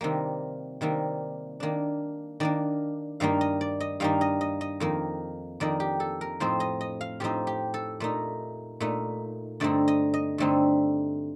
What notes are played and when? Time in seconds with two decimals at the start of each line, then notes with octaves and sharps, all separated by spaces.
0.01 C3 D#3 G3 A#3
0.81 C3 D#3 G3 A#3
1.60 D#3 A#3 D4
2.40 D#3 A#3 D4 D5
3.20 G2 D#3 G3 A#3 D#4 F5
3.41 D#5
3.61 D5
3.80 D#5
4.00 G2 D#3 G3 A#3 D#4 F5
4.21 D#5
4.41 D#5
4.61 D#5
4.80 F2 D#3 A#3 D#4
5.60 F2 D#3 A#3 D#4 D5
5.80 G4
6.00 A4
6.21 A#4
6.40 A2 F3 C4 D#4 C5
6.60 D#5
6.81 D#5
7.01 F5
7.20 A2 F3 C4 D#4 G4
7.47 G4
7.74 A4
8.00 A#2 A3 D#4
8.80 A#2 A3 D#4
9.60 G2 D3 A3 C4 D#4 D5
9.88 D#5
10.14 D#5
10.38 G2 D3 A3 C4 D#4